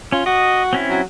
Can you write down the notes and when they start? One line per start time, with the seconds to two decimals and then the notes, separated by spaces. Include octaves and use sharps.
0.12 C#4 F4
0.26 F#4 D#5
0.73 C4 C#4 E4
0.89 F#3